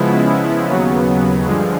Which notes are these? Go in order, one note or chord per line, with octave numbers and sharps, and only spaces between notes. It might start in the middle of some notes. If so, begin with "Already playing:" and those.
Already playing: C#3 F3 G#3 B3 E4
D#2 C#3 F#3 B3
G2 D3 F3 G#3